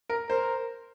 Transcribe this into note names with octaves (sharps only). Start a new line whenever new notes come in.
A#4
A#4 C5